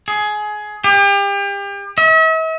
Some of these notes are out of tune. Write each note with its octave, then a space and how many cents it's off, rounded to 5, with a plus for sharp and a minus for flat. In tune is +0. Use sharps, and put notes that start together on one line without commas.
G#4 +20
G4 +35
E5 -45